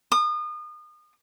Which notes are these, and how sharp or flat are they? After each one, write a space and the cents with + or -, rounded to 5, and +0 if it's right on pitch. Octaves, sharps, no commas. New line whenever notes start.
D#6 -35